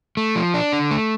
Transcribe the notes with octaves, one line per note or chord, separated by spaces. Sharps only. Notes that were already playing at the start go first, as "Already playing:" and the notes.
A3
F3
D4
D3
A3